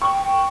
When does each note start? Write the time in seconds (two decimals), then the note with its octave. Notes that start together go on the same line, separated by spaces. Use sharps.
0.01 G5 C#6
0.22 G5